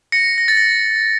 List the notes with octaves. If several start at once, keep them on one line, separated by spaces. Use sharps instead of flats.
A#6 C#7
A#6
A6
A#6